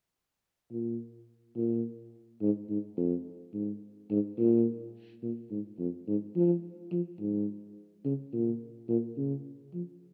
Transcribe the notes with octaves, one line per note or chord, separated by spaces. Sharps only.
A#2
A#2
G#2
G#2
F2
G#2
G#2
A#2
A#2
G#2
F2
G#2
F3
F3
G#2
C#3
A#2
A#2
C#3
F3